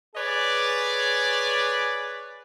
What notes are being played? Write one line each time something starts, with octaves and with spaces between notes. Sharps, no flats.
G#4 B4 C#5 D5